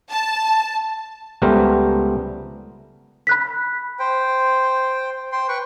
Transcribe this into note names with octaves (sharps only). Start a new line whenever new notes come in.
A5
C#2 G3 A3 B3 A#4 C5
B5 F#6 B6
C5 G5
C5 G5 C6
B4 G5 C#6